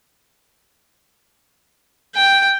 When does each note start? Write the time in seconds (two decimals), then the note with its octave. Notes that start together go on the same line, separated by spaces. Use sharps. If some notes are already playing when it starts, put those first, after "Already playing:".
2.15 G5